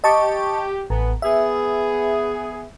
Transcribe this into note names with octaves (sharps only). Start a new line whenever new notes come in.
G4 D#5 A5 C#6
A1 B3
B3 G#4 E5